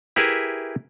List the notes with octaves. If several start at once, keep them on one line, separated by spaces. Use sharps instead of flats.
E4 G4 G#4 A#4 B4 E5